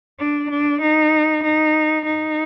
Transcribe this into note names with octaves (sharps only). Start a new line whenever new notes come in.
D4
D4
D#4
D#4
D#4